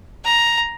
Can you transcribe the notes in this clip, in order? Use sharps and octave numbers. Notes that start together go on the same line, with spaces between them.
A#5